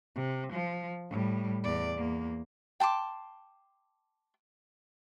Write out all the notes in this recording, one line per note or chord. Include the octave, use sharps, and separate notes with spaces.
C3
F3
A2 G3
E2 D5
E2 A#3
G5 A5 C6 D6